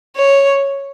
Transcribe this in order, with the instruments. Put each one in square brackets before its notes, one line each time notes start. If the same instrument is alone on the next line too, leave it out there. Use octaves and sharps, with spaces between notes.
[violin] C#5